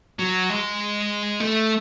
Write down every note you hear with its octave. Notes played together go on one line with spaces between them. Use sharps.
F#3
G#3
A3